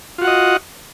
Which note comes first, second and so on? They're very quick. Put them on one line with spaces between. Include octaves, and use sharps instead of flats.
F4 F#4 F#5 D#5